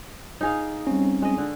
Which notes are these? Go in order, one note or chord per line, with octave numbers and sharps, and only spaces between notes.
D#4 G#4 F5
G3 C4 C#4
G#3 D#5
D3